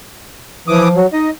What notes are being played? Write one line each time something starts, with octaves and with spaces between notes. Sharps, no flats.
E3 F3 D6 D#6
F#3
D#4 D#5